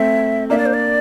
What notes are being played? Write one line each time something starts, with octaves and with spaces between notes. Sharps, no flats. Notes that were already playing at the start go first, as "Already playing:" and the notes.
Already playing: A3 C4 E5
A#3 D4 E5
D5
C5
D5